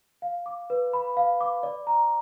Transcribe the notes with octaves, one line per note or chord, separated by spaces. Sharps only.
F5
D6
B4
B5
F5
D6
D5
A#5